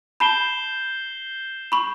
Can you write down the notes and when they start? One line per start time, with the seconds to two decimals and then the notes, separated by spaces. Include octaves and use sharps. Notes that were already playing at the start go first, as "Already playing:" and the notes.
0.20 A5 B5 G6 C7 E7 G7
1.72 B5 C#6